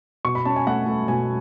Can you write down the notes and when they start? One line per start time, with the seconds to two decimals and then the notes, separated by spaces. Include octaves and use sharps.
0.25 B2 C#6
0.35 B5
0.45 C#4 A5
0.56 G#5
0.67 A3 F#5
0.87 A3
1.08 B2 G#5